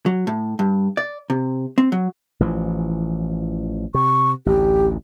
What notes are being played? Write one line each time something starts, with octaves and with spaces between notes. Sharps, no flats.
F#3
A2
G2
D5
C3
C4
F#3
A1 E3 F3
C3 C#6
A1 D2 G4